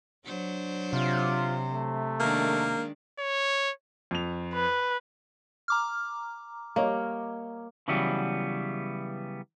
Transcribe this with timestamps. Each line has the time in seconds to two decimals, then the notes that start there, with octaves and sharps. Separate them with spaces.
0.25 F#3 D4 C5
0.93 C3 F4
1.71 A3
2.20 D#3 G#3 A#3 D4
3.19 C#5
4.11 F2 F7
4.54 B4
5.68 A#5 D6 F6
6.76 G3 A#3 C#5 D#5
7.88 C#3 E3 F#3 G3 B3